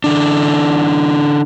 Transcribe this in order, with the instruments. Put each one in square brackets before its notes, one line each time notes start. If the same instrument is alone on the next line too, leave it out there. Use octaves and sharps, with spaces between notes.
[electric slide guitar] D3 E3 D4